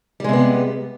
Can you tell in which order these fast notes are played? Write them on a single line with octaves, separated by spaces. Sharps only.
G3 G#3 C3 B3